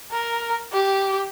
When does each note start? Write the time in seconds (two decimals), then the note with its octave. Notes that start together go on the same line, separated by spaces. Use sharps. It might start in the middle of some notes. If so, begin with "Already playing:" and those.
0.12 A#4
0.73 G4